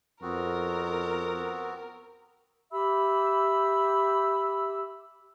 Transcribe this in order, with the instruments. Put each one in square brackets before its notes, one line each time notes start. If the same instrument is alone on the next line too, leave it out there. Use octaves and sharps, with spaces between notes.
[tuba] F2 [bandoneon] B3 C4 F#4 [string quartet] A#4
[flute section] G4 E5 B5 E6